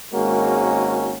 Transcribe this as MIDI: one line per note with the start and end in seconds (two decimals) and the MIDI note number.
0.13 1.17 32
0.13 1.17 56
0.13 1.17 58
0.13 1.17 61
0.13 1.17 66
0.13 1.17 70